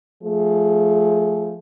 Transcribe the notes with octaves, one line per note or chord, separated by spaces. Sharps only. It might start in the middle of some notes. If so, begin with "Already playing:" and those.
F3 A3 G#4